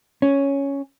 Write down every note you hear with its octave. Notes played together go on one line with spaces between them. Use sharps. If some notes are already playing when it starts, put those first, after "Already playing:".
C#4